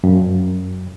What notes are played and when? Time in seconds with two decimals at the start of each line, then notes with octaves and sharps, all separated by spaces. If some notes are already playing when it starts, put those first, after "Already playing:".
0.04 F#2